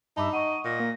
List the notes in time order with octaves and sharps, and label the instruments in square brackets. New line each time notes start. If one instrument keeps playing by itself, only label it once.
[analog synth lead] G2 [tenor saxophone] D#4 [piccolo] E5 [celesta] A5 B5 D6
[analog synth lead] D#5 [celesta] F#5 C#6 [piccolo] D#7
[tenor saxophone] A#2 [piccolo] A#6
[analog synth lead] A#3